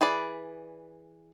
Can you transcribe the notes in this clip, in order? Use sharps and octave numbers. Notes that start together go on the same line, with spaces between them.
E3 G#4 B4 D5